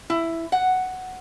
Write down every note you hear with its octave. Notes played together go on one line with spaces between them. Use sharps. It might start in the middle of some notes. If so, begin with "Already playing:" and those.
E4
F#5